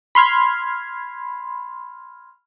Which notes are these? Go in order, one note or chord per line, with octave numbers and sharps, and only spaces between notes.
B5 C6 F6 G#6